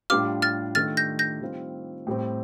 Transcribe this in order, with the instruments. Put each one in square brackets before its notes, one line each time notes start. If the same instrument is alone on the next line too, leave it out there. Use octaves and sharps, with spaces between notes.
[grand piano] A2 G3 D4 F4 [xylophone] D6 F6
[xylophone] F6 A6
[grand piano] D#3 A3 D4 F4 [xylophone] F6 A6
[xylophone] G6 A#6
G6 A#6
[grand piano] D#3 G3 C4 F4
A2 G3 C4